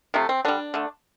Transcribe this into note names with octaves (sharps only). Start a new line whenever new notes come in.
C3 F3 A3
C4
D3 G3 D4
D3 A3